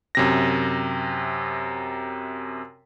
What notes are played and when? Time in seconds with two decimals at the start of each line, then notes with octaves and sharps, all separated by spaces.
0.15 F#2 C3 A#6